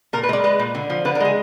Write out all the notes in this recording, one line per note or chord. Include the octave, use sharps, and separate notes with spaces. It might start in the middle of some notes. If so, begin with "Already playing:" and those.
A#2 A#4
B4
G#3 D5
G#3 B4
A#2
D3
F3
D3 B4
A#4
G#3 G#4